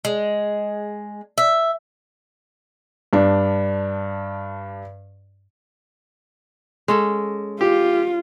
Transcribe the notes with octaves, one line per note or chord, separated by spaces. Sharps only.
G#3
E5
G2 D4
G#3 C#4 A4
F4 G4